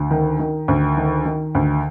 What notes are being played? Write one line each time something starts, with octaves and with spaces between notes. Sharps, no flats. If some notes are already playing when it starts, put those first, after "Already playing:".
Already playing: D2
D#3
D#3
D2
D#3
D#3
D2